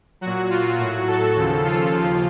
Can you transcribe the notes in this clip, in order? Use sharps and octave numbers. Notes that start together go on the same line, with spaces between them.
A#2 F#3 F#4
F4
A2 F#3 F#4
A4
D#2 C#3 F3
F4
D#2 C#3 F3